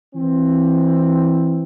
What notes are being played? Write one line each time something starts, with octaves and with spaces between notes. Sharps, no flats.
E3 C4